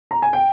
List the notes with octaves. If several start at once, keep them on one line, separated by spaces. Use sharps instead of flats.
A#5
G#5
G5